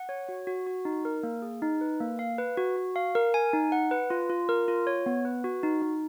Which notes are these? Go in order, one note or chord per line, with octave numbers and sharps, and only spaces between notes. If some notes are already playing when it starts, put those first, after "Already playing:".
Already playing: F#5
C#5
F#4
F#4
F#4
D#4
A#4
A#3
G#4
D#4
B4
A#3
F5
B4
F#4
F#4
F5
A#4
G#5
D#4
F#5
B4
F4
F4
A#4
F4
C#5
B3
B4
F#4
D#4
D#4